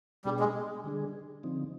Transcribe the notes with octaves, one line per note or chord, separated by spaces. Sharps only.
B2 G3 B3 D4 G#4
G#3
D3 G3 D4 G#4
D3 F3 C4 D#4